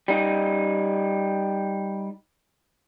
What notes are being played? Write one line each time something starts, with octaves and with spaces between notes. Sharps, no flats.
G3 D#4